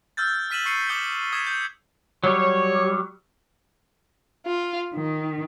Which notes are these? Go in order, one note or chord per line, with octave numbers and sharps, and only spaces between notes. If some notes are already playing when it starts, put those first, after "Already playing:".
E6 F6 G6 A6
F6 B6 D#7 E7 F#7
C#6 C7 C#7 D#7
D6 D#6 G6 C#7 G7
D#6 G#6 B6 E7
G6
F#3 G3 C#5
F4
D#3